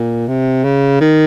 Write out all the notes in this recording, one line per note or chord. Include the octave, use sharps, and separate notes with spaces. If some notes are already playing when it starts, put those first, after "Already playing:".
Already playing: A#2
C3
C#3
D#3